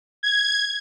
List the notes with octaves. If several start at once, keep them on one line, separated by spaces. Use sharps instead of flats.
G#6